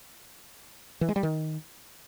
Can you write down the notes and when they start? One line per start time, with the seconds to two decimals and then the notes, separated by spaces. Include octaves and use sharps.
1.01 E3
1.09 G#3
1.16 G3
1.23 D#3